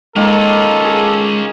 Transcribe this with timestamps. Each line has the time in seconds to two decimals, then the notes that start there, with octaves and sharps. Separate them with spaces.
0.16 D#3 G#3 A#3 C#4 F4 A4
0.84 G#4